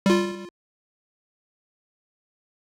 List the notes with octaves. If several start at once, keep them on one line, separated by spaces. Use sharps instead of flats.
G3 F4